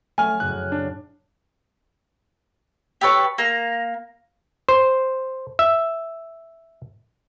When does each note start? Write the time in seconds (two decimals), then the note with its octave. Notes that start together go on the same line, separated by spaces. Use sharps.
0.18 F#3 A3 G#5 F6
0.40 F#1 F#2 A2 F#6
0.72 D4
3.01 G4 A4 B4 C#5
3.38 A#3 A#5
4.69 C5
5.59 E5